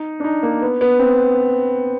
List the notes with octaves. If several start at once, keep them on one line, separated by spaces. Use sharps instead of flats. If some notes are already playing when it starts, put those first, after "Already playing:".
Already playing: D#4
D4
D#4
A#3
B3
B3
C4